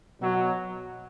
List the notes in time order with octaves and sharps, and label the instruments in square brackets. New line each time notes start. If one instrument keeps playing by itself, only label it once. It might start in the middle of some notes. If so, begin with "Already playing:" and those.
[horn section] B2 F#3